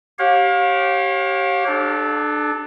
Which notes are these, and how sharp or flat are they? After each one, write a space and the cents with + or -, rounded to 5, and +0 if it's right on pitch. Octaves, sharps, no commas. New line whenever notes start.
G4 -20 C#5 -30 F5 +30
D4 +25 A4 -25